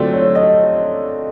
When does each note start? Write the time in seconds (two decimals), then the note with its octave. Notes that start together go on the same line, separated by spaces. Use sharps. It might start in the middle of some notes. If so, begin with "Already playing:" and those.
Already playing: D3 F#3 A3 C4 F4 D5
0.13 C#5
0.35 D#5